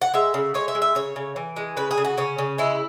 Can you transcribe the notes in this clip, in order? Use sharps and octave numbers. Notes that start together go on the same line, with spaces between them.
F#5
G#3 E5
C#3
G#3 C#5
E5
G#3
E5
C#3 C#5
C#3
E3
G#3
C#3 B4
G#4
C#3
F#4
C#3 C#4
C#3
G#3 E4